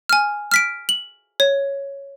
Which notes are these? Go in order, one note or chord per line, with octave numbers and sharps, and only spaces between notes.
G#5 F6
F6 B6 D7
F#7
C#5